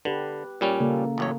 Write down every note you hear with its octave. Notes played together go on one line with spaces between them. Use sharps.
D3 G4 B4
A#2 G3 C#4
C#3 A#3 A4
A1 F#2 C#5